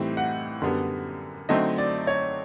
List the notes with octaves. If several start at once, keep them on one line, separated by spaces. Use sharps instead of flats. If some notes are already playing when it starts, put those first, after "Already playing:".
Already playing: A2 E3 G3 C4 D#4
F#5
F#2 D3 G3 B3
D3 F#3 A3 C4 D#4 D#5
D5
C#5